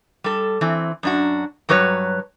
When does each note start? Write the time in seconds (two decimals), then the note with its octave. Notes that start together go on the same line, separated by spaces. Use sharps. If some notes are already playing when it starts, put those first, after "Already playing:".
0.24 G3 A4
0.61 E3 C4
1.03 F#2 D4 F#4
1.69 G2 F#3 F#4 B4 C#5